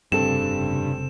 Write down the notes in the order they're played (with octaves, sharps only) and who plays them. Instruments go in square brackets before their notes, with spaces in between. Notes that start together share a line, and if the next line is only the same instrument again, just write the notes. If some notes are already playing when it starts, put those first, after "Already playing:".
[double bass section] F1 C#3 [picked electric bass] G2 [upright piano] C4 A4 [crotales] E7